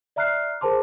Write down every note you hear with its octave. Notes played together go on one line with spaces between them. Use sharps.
D5 E5 A#5 F6 F#6 C7
G#4 A#4 C5 A5 C6 D6